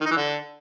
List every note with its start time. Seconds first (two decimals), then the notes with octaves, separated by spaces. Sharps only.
0.01 D#3
0.06 D#4
0.11 E3
0.16 D3